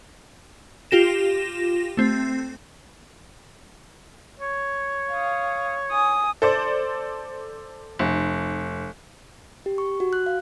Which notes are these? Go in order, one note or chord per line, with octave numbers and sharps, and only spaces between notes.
F4 G4 A#6 E7
A3 C4
C#5
F5 D#6
G#5 D#6
A4 C5 D5
F1
G4
C#6
F#4
F#6
F5